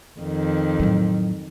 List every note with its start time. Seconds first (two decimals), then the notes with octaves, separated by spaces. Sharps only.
0.20 F2 D#3
0.80 A2 F#3